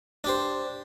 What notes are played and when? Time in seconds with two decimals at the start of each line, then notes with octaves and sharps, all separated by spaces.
0.24 D4 G4 C5